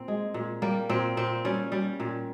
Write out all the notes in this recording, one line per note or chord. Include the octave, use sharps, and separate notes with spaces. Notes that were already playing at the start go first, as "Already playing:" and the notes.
Already playing: A#2 C4
G#3
A#2
G3 A#3
A#2 C4
A#2 C4
G3 C#4
G3
A#2